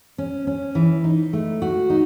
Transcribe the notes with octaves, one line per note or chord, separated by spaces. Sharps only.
C#4
C#4
E3
D#4
A3
F#4
D#4